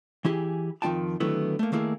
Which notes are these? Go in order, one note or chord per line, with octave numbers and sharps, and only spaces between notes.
E3 E4 G4 G#4
F2 D#3 G#3 F4 G5 A5
D3 D#3 F#3 A3 B3 E4
A3 A#3
D#3 A3 A#3 E4 G#4